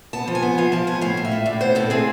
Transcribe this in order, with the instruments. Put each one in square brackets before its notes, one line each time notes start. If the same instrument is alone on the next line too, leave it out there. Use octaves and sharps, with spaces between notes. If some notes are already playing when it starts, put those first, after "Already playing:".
[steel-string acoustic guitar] B3 A5
F3
G#5
B3
F3 F5
F3 A5
B3 G#5
A2 F5
A2
E5
A2
A2 D5
B3 C5
A2 A4
C4 G#4